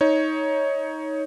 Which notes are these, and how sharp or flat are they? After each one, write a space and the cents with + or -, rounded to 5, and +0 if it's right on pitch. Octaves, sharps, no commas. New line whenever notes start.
D#4 +15 C#5 +0